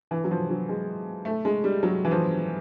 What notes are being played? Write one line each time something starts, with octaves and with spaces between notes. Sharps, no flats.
E3
F#3
F3
F#3
G#3
A3
G#3
G3
F#3
E3
F3